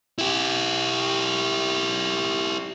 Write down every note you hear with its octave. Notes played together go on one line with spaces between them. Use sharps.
E4 G4